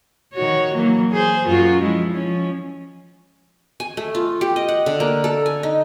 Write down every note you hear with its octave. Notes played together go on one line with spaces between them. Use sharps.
D#3 F#4 C#5
E3 F#3 A#3
G#4 C5
F#2 F4 F#4
F3 G#3 E4
F3 C#4
G#5
A3
F4
G4
D#5
F#5
D3
A#3
A4
G#5
D#4